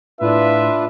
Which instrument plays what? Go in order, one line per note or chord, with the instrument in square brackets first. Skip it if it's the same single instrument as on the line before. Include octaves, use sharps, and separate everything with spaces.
[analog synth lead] A2 [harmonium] D4 F4 B4 [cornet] E5